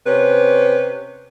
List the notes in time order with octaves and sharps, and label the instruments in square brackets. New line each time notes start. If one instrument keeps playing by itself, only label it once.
[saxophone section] C3 C#4 B4